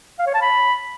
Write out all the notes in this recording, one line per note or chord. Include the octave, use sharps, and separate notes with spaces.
F5
C#5
A5
B5